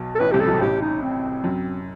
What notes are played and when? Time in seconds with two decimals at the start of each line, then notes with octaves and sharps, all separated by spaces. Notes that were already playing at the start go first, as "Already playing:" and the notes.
Already playing: B1 B2
0.15 A4
0.19 A1 A2 B4
0.32 C2 C3 G4
0.41 A4
0.47 B1 B2
0.61 A1 A2 G4
0.82 D#4
1.02 C4
1.44 F#2